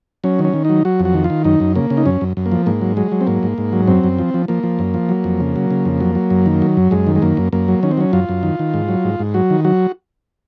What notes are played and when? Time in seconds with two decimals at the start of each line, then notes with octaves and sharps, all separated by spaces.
0.24 F#3 C#4
0.39 D#3
0.44 C#4
0.53 D#3
0.65 F#3 D#4
0.85 F#3 F#4
1.00 F2
1.05 F#4
1.14 D#3
1.24 F4
1.30 D#3
1.45 F#2 D#4
1.60 F#2
1.76 C#3 A#3
1.90 C#3
1.97 D#4
2.05 F#2 C#4
2.21 F#2
2.37 F#2
2.46 A#3
2.52 F3
2.66 G#2 A#3
2.81 F#3
2.96 F#3 G#3
3.12 F#3
3.21 C4
3.27 G#2 A#3
3.43 G#2
3.58 G#2
3.73 F#3
3.87 F#2 C4
4.04 F#2
4.19 F3
4.34 F3
4.48 F3 A#3
4.63 F3
4.79 F#2
4.94 F3
5.09 F#3
5.24 F2
5.40 C#3
5.56 F#3
5.70 C#3
5.85 F2
6.00 F#3
6.15 F#3
6.30 F#2
6.46 D#3
6.62 F#3
6.77 F#2
6.91 F#2 G#3
7.07 D#3
7.16 G#3
7.22 F#2 A#3
7.37 F#2
7.53 F#2 A#3
7.68 F#3
7.83 D#3 C#4
7.91 C4
7.97 F#3 C#4
8.13 F#2 F4
8.29 F#2
8.43 D#3
8.59 D#3
8.74 G#2
8.88 F#3
9.05 G#2
9.19 G#2
9.34 F#3 F#4
9.50 D#3
9.65 F#3 F#4